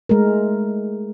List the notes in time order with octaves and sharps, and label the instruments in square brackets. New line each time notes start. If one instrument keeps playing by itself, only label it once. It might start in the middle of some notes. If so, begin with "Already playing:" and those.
[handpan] G#3 A3 A#4